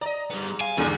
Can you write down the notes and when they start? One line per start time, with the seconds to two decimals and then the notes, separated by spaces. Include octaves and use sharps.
0.01 D5 D#5 A#5
0.30 G#2 G3 B3
0.61 F5 G#5
0.77 E2 G#2 D3 E3 G3 A#3 G4 G#4